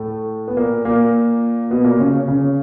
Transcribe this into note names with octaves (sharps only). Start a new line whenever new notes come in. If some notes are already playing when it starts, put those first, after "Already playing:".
Already playing: A2 A3
B3
A#2 A#3
A#2 A#3
B2 B3
A#2 A#3
C#3 C#4
C#3 C#4